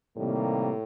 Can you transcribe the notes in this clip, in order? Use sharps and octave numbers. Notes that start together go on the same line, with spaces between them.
A2 C3 D#3 G3 A#3